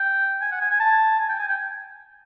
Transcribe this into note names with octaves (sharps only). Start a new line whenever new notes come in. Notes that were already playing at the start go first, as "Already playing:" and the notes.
Already playing: G5
G#5
F#5
G#5
G#5
A5
G#5
G5
G#5
G5